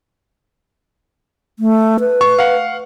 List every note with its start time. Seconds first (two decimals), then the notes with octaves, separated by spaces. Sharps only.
1.59 A3
2.00 B4
2.21 C#6
2.39 F5 F#5